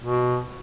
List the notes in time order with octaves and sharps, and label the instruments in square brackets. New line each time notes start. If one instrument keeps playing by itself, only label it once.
[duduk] B2